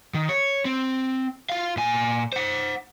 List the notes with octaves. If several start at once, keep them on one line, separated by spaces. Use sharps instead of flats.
D#3
C#5
C4
F4 F5
A#2 G#5
C5 F#5